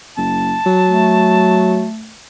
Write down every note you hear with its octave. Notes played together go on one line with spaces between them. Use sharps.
F#1 A5
F#3
A3